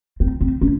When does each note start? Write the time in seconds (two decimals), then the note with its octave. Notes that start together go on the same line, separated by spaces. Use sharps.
0.20 C4
0.41 C4
0.61 C#4